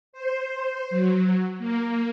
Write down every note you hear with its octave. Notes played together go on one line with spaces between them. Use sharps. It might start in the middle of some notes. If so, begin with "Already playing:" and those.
C5
F#3
A#3